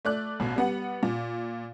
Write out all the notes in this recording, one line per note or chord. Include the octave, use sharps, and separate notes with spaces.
A3 D5 F#6
A1 B2
G3 B3 F#5
A#2